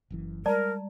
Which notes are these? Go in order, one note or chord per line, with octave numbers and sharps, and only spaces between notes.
F#1 F#2 E3
G3 G#3 A#4 D5 A5 A#5